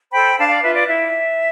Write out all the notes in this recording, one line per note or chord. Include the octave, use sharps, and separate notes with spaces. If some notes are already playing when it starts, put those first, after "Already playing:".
A4 C5 G5 B5
D4 F5 A5
D5 F5
F4 B4 E5
D5
E4 E5